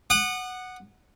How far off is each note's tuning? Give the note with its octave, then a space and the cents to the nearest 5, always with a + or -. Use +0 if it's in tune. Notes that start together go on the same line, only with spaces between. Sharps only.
F#5 +0 D#6 -35